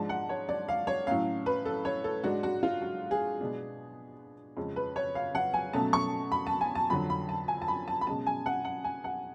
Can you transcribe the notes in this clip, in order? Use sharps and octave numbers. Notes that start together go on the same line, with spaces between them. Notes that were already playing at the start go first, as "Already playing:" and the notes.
Already playing: G#2 F3 G#3 D4 A5
F#5
C#5
D5
F5
C#5
A2 F#3 C#4 F5
B4
A4
C#5
A4
G#2 G#3 D4 F#4
F#4
F4
F#4
G#4
B2 G#3 B3 D4
F2 C#3 G#3
B4
C#5
F5
F#5
G#5
B2 F#3 A3 C#4 A5
C#6
B5
A5
G#5
A5
F2 D3 F#3 B5
B5
A5
G#5
A5
B5
A5
B5
B2 G#3 C#4 A5
G#5
F#5
F#5
G#5
F#5